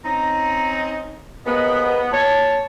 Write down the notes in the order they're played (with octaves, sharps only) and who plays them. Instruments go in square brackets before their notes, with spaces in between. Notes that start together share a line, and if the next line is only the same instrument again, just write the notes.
[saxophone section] C4 C#4 D#4 [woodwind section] A#5
[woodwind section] D#2 G#2 D#5 [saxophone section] B3
[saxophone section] A#2 C#5 [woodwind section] A5